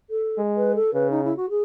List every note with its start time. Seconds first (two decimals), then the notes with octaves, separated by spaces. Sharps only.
0.10 A4
0.38 G#3
0.57 B4
0.75 A4
0.94 C#3 B4
1.11 D#4
1.24 E4
1.37 F#4
1.50 G#4